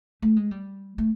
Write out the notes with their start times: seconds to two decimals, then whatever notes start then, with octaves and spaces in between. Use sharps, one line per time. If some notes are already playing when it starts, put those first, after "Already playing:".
0.22 A3
0.36 G#3
0.51 G3
0.98 A3